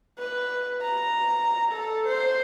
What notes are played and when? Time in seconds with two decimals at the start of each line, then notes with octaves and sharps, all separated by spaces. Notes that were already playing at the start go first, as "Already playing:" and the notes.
0.18 B4
0.82 A#5
1.72 A4
2.07 C5